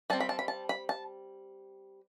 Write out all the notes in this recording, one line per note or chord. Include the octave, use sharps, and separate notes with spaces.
G3 C4 A5
B5
A5
B5
A5
B5
A5